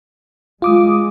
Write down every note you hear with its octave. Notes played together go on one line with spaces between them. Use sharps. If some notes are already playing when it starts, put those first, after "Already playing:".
G#3 F4 D6 D#6